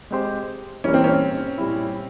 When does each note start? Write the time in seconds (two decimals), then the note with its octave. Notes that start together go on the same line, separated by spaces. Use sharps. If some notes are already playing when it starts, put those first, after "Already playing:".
0.11 G#3 C4 G4 C5
0.84 E3 G3 A#3 C#4
0.94 C4
1.04 C#4
1.58 A#2 G3 C#4 E4